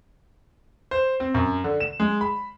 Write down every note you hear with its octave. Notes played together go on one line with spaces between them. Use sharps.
C5
C4
F#2
D3
E7
G#3
B5